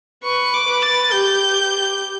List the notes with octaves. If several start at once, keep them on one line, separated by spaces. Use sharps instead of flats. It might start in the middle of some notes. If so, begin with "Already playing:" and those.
B4 C#6
D6
B4
A6
G4 G6